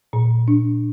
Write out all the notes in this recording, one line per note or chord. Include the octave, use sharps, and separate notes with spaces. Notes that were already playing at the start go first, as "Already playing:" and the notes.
A#2
D4